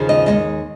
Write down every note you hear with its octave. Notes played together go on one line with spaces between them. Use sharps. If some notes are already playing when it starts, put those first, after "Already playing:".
Already playing: D#2 C#3 F3 C#4
D#5
D#2 D#3 G#3 D#5